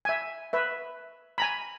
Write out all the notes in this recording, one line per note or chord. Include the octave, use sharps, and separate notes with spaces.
E5 G#5
B4 E5
G#5 A#5 B5